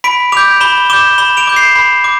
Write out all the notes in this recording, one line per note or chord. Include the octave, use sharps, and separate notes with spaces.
B5 B6 D7
D6 G6 D7 F7
B5 E7 G7
D6 G6 E7 G7
B5 E7 G7
D7 F7
D6 G6
C7 E7
B5
D6